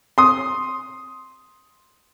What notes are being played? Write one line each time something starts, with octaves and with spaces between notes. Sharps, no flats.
C6 D#6